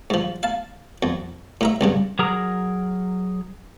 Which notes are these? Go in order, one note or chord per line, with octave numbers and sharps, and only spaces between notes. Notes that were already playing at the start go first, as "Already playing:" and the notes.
G#2 F3
F5 A5
F2
A2 A#4 E5
C2 G2 C#3
F#3 G#4 A#4 A#5